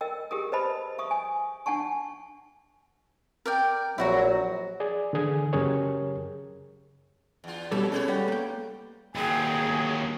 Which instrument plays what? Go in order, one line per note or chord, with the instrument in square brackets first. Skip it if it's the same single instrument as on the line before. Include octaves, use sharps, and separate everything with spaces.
[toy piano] A#4 D#5 G5 E6
G4 G#4 A#4 D#6
B4 C5 D#5 A5 B5
E5 C#6 D#6
G#5
D4 F#5 G#5 A5 C#6
[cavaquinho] A#4 D5 G5
[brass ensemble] A#1 F#3 [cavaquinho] E4 F#4 A#5
[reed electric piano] G#4 D5
D3 E3 G#4
F#2 C#3 G4 G#4 A#4 C#5
[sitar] E2 F4
[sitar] F2 C#5 [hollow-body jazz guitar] B2 G3 A4
[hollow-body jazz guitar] C#4 G#4 [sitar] A4 B4 C#5
[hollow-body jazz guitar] G3 F#5 G5
A#3 G5
[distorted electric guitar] D#2 F#3 [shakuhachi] G#4 [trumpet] G5